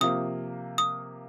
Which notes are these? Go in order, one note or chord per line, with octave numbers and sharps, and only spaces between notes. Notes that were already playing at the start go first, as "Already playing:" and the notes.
C3 F3 A#3 D#6
D#6